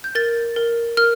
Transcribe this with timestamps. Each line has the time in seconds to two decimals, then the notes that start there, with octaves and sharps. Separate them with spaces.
0.04 G6
0.15 A#4 A6
0.56 A#4
0.97 A#4 F6